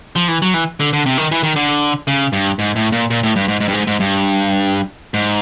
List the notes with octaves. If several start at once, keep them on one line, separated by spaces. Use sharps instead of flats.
F3
E3
F#3
E3
D3
D3
C3
D#3
E3
D#3
D3
C#3
G2
G#2
A2
A#2
A#2
A2
G2
G#2
G#2
G2
G#2
G#2
G2
G#2